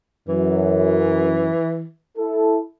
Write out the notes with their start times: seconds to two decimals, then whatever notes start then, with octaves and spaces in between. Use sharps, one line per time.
0.28 F#2 E3
2.18 E4 A4